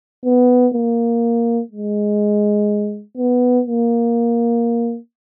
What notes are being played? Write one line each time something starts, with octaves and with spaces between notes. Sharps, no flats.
B3
A#3
G#3
B3
A#3